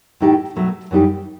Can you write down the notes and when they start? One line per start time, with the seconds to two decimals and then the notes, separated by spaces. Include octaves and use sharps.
0.20 A2 E3 A3 D#4 G4
0.56 B2 F#3 A3
0.91 F#2 E3 G3 D#4 G4